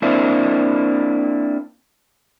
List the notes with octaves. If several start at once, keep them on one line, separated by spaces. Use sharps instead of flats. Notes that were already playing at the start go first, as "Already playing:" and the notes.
A#3 C4 D4 E4